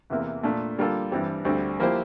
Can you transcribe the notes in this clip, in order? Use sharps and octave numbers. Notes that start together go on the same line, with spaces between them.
E2 C3 E3 A#3
A#2 A3 D4
D3 G3 A#3 F4 A4
G2 E3 G3 C4
D2 D3 G3 C4
F3 A#3 E4 G4 C5